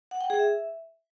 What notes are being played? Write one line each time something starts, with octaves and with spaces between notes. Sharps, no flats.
F#5
G5
G#4
E5